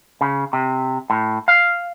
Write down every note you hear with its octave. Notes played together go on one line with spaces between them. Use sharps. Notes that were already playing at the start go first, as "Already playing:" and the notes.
C#3
C3
A2
F5